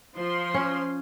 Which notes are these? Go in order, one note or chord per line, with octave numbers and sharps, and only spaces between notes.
F3 C6
C#4